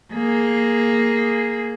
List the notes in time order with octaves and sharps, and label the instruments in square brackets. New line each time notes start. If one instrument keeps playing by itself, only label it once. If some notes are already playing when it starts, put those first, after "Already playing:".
[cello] A#3 G#4